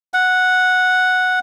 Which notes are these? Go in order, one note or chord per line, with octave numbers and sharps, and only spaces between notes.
F#5